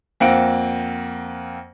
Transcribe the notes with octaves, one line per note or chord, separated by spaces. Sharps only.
F2 A#3 C4 F#5 D7